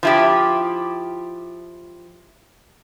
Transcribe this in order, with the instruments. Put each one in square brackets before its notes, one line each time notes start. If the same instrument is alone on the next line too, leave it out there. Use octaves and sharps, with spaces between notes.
[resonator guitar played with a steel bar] F3 E4 G4